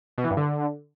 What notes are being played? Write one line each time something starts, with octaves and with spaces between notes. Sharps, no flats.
B2
E3
G2
D3